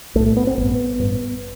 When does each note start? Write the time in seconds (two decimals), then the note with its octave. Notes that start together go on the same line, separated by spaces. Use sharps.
0.15 B1 A3
0.19 A2
0.26 A3
0.37 B3
0.47 C4
0.58 A1 G2 B3
0.99 A1 G2